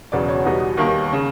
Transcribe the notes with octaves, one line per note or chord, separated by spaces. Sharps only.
E1 E2 C#3 F#3 D5
C#5
E2 B2 G3 B3 D#4
D#2 D#3 G3 A#3
C#3